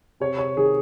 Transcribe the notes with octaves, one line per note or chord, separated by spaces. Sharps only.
C3 C#5
C#5
D#3 G#4